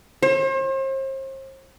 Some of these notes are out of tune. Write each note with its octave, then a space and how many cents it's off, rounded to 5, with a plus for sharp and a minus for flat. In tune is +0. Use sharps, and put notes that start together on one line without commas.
C5 +40